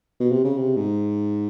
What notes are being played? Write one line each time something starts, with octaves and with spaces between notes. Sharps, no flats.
B2
C3
C#3
C3
G#2